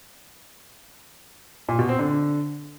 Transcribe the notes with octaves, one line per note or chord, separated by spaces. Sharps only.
A#2
B2
C4
D3